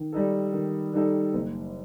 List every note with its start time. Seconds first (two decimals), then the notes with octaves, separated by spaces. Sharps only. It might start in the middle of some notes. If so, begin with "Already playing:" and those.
Already playing: D#3
0.12 G3 D#4 A4
0.53 D#3
0.93 G3 D#4 A4
1.33 F#1